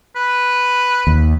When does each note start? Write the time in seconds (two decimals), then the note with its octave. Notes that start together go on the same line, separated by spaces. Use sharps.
0.16 B4
1.07 D#2